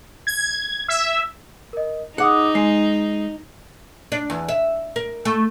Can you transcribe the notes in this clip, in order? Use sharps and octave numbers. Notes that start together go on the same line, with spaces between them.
G#6
E5
A#4 D#5
D#4 G#4 F#5 D6 D#6
G#3 C7
D4
E2
E5
A#4
A3